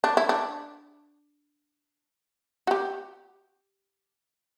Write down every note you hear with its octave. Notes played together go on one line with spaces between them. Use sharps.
D4
E4
D4
F#4
G4